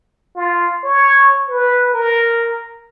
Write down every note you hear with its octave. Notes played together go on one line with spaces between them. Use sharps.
F4
C#5
B4
A#4